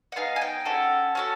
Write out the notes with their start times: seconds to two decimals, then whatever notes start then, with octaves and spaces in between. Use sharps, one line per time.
0.12 F#5
0.16 B3 D#4 G#4 F5
0.36 G#5
0.42 G5
0.65 C#4 F#4 A4
1.15 C#4 F#4 A4